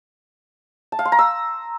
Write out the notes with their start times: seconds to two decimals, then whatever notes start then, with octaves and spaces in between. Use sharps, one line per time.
0.92 A5
0.99 F5
1.05 C6
1.12 A#5
1.19 E6